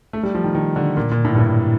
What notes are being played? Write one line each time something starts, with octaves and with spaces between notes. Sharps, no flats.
A3
G3
F3
D#3
D#3
D3
A#2
A#2
A2
G2
A2